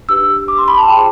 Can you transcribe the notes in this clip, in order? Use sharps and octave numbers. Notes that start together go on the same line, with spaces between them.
D4 G4 B4 E6
D6
C6
B5
A5
F4 G#4 C5 G5